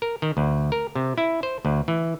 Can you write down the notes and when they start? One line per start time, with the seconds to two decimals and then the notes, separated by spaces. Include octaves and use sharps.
0.02 A#4
0.22 D#3
0.37 D2
0.72 A#4
0.95 C3
1.18 E4
1.43 C5
1.65 D2
1.88 E3